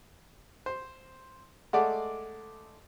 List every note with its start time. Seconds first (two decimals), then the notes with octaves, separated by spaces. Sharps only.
0.66 C5
1.73 G#3 A3 D5 F#5